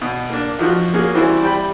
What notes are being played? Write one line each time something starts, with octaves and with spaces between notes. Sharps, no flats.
B2
A#3 D4
F2 F3 F#4
A#3 C#4 F#4 G#4
E3 G3 C4 E4 F#4
G3 G5 B5